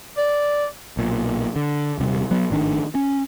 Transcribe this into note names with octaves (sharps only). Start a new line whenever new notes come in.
D5
B1 A#2
D3
D#1 C3 G3
F#3 B3
G#1 A2 D#3 D4
C#4